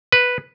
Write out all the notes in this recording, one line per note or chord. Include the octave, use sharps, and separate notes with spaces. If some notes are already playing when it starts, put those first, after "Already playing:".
B4